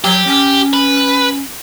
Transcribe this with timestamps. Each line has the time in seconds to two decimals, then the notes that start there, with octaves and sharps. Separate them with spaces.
0.04 F#3 G4
0.27 C#4
0.73 B4